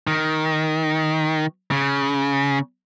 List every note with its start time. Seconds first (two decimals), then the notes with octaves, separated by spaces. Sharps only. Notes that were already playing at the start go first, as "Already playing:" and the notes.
0.07 D#3
1.71 C#3